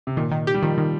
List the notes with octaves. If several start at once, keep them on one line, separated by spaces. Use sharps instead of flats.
C3
A#2 D#3
D#3
G4
G3
D#3 F3
D#3